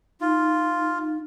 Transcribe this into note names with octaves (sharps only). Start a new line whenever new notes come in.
D#4 F4